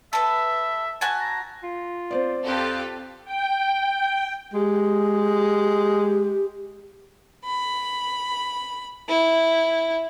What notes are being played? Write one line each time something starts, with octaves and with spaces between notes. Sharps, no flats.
A4 B4 E5
F#4 G#5 A5
A#5
F4
C4 C5 D5
F2 F4 G4 A4
G5
G#3 G4
B5
E4